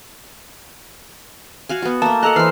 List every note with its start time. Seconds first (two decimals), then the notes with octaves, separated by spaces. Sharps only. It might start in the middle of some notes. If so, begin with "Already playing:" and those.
1.69 F#4 F5 G#5
1.82 B3 F#4
2.02 A3 A#3 A5
2.23 A4 D#5 F#5 A#5 F#6
2.36 E3 C5 F6 C7